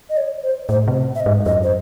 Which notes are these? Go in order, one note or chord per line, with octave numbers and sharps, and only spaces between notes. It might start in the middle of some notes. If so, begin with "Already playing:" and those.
D#5
C#5
C5
A2 C5
C3
E5
D#5
G#2
F#2 D#5
C5